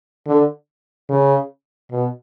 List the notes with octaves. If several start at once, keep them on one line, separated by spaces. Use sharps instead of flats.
D3
C#3
B2